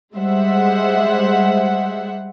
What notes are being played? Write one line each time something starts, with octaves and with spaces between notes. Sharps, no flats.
G3 G#3 C5 E5 F#5